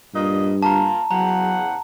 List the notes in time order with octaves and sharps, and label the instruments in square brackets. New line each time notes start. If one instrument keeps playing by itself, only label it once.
[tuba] G2 [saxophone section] A#2 D#5
[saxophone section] A#3 F4 [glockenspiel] A5 A#5
[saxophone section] E2 C#3 F#5 [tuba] F#3 [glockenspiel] A#5